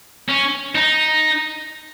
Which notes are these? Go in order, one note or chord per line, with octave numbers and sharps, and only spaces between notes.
C#4
D#4